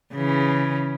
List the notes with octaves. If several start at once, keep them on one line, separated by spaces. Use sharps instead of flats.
C#3 E3